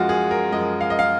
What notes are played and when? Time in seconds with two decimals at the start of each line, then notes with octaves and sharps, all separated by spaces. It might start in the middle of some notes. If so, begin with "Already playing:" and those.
Already playing: F#2 F3 G#3 F4 F#4
0.09 G#4
0.31 A#4
0.52 F#2 F3 G#3 D#5
0.81 F5
0.90 D#5
0.99 F5